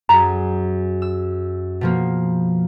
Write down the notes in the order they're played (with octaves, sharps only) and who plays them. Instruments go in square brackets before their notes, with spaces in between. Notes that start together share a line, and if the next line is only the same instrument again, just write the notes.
[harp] F#2 G#4 [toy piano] A#5
[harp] E6
B2 F3 A#3